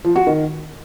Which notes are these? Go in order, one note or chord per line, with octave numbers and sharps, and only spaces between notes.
F3
F#4
D#3